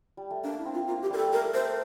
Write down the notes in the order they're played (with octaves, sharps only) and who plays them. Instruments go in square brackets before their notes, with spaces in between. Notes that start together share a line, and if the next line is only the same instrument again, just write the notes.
[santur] G3
A3
[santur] A#3 [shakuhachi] D4
[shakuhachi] E4
[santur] C4
[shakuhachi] F4
[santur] A#3 [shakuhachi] F4
[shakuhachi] G4
[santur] G3 [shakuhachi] A#4
[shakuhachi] A4
[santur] A3 [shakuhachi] A#4
[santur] A3 [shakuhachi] C5